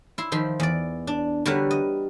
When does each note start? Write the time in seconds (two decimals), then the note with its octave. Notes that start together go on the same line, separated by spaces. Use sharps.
0.18 E4 C6
0.32 D#3 F3 B5 C6
0.60 E2 D5
1.07 D4
1.46 D3 G3 F#4 A#4 B4 C#5
1.71 D#5